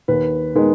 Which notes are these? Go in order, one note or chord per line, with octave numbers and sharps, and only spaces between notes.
D#2 B4
D#3 G#3 B3 D#4